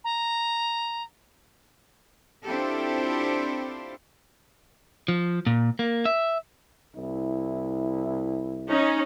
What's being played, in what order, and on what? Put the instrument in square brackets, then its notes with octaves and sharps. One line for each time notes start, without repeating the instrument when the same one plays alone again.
[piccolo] A#5
[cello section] C4 D4 E4 F4 G4 A4
[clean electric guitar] F3
A#2
A#3
E5
[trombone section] C2 E4
[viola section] C#4 D#4